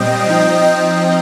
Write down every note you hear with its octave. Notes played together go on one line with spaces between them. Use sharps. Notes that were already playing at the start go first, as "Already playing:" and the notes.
Already playing: A#2 G3 C4 D#5 G5
F3 C4 D#4
D#5 G5